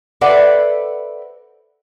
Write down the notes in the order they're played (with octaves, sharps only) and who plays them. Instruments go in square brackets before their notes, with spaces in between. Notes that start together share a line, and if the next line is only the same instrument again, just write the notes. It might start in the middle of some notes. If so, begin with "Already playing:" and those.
[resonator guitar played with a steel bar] A4 B4 C5 D5 E5 F#5